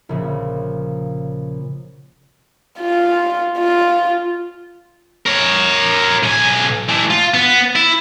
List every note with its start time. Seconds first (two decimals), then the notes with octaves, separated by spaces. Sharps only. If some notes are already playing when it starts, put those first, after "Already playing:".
0.09 A#1 C#3
2.79 F4
3.58 F4
5.26 A#4 C#5
6.23 B1 G#5
6.89 E3 A3
7.10 F4
7.34 B3
7.76 E4